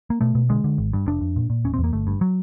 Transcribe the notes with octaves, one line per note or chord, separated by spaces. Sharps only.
A#3
B2 A3
B2
D3 G#3
D3
G#1
G2
F1 D4
F2
A#2
A#2
E1 C#4
C4
E2
A#3
G1 A3
G2
F#3